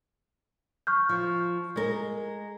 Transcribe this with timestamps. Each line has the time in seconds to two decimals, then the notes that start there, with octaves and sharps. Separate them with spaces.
0.87 C#6 F6 G6
1.09 F3
1.76 G#3 A#4